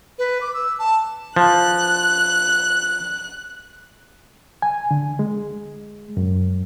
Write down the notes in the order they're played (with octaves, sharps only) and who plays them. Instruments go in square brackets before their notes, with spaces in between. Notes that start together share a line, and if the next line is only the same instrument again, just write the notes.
[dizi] B4
D6
E6
A5
[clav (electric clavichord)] F3 [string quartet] F#6
[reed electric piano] G#5
D3
G#3
F#2